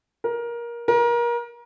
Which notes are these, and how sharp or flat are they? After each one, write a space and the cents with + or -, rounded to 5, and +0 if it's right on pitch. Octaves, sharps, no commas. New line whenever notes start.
A#4 +20
A#4 +30